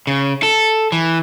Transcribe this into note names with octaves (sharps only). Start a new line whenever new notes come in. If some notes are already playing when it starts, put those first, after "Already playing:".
C#3
A4
E3